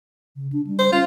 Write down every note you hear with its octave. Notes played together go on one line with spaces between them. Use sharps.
C#3
D4
G3
C5
C#4 F4